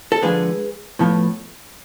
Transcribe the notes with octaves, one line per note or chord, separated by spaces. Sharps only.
A4
D3 F3 G#3 G#4 B4
A2 F3 B3